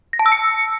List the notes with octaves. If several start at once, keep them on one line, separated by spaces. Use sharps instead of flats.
A#6
A5
E6
C#7